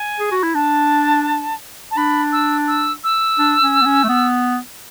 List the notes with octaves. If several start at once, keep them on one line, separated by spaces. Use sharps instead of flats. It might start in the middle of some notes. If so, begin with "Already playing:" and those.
Already playing: G#5
G#4
F#4
E4
D4 A5
A5
D4 B5
E6
E6
E6
D4
C#4
B3
C#4
A3
B3